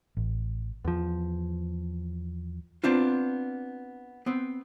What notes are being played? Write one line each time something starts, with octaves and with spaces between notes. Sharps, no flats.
A1
E2 F3
B3 C4 D4 F4
B3 C4